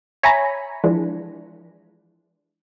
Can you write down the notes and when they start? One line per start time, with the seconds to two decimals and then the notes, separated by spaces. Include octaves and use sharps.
0.23 C#5 E5 G#5 A#5 B5
0.84 E3 F3 G#3 D4